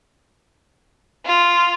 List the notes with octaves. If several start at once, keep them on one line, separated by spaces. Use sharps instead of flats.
F4